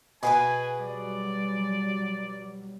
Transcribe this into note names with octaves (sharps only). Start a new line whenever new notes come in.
B2 G#4 A#4 B4 G#5
F#3 G3 D5